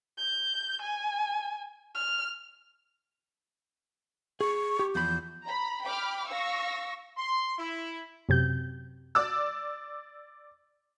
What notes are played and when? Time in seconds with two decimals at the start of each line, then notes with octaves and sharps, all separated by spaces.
0.18 G6
0.81 G#5
1.95 F6
4.41 G#4 C#6
4.79 G4
4.95 E2 F3 B5 G6
5.42 A#5 B5
5.82 G5 B5 D6 F6
6.28 F5 C#6 E6 A#6
7.18 C6
7.58 E4
8.29 F#2 C3 G6
9.15 D5 D6 E6